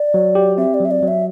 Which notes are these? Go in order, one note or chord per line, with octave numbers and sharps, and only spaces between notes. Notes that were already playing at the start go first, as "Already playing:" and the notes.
Already playing: D5
F#3
G4
C4 E5
D5
F#3 E5
D5
F#3
E5